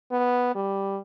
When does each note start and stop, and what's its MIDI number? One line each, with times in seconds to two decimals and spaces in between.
0.11 0.54 59
0.55 0.99 55